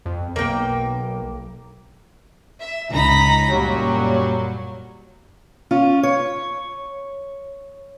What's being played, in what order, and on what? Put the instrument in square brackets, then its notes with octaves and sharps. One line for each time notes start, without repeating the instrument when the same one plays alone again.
[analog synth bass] F2
[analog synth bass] B1 [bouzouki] A#3 G5
[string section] E5
C#2 D#4 A#5 B5 A#6 B6
F#2 A#2 F#3 G3
[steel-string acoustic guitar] C#4 F4
C#5